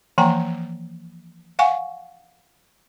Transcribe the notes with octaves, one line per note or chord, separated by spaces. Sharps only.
E3 F3 A#3 G5 G#5 A#5
F5 F#5 G#5 C#6